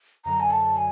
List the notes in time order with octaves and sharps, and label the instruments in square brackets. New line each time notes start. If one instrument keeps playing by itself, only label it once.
[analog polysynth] F#2 D3 F#3 [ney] A#5
[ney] G#5
A5
G#5